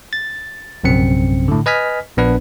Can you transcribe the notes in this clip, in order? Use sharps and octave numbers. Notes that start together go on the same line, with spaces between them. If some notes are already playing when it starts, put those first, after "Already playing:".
A6
A#1 F#2 C3 C4 C#7
A2 D3
B4 D#5 G#5 F6 B6
A#1 B3 D4 B4